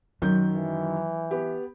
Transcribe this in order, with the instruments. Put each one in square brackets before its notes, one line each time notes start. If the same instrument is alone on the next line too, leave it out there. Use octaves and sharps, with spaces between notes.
[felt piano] F#2 D#3 G6 [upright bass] F#3
[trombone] E3
[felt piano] B3 G4